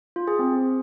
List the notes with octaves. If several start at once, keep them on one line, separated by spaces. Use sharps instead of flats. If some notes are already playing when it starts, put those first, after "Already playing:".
F4
G#4
C4